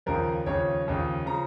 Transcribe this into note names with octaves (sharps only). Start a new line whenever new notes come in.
D#2 C#3 F3 A#4
D#2 C#3 F3 C#5
D#2 C#3 F3
C#3 F3 A#5